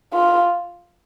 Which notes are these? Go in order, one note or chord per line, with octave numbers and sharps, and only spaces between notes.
F4